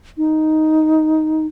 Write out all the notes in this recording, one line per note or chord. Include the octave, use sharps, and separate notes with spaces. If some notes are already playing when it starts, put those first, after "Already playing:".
D#4